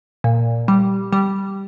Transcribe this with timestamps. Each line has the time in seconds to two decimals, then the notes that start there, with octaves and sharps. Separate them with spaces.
0.24 A#2
0.68 G3
1.13 G3